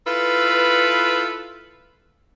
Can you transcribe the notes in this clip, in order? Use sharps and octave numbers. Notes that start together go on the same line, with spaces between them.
E4 F4 A4 B4